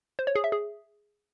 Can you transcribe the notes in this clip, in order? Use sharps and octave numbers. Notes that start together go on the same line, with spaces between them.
C5
C#5
G#4
E5
G#4